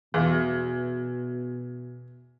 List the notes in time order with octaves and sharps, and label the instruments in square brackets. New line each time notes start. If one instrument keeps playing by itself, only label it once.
[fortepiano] E2 [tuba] B2